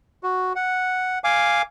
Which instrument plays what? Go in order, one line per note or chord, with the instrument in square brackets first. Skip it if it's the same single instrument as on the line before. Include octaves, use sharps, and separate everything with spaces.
[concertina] F#4
F#5
F5 G#5 D6